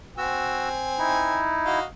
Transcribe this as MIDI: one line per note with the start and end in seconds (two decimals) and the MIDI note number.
0.18 1.48 60
0.18 0.69 66
0.18 1.48 80
0.18 0.69 88
0.99 1.79 63
0.99 1.79 64
1.66 1.84 66
1.66 1.84 75
1.66 1.84 77